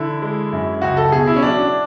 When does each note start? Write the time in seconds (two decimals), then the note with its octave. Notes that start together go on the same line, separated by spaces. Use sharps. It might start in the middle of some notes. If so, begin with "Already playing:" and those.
Already playing: D3 E4
0.22 G#3
0.52 F#2
0.82 C#2 F#4
0.97 A4
1.12 B2 G#4
1.27 E4
1.36 C#4
1.42 F#3 D4